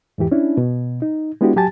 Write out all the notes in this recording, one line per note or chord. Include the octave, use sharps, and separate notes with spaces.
E2 G#2 E3 G4
C#4 D4 E4
B2
D#4
G#3 B3 D4 E4 F#4 G4
F#3 G4 G#5 A5 A6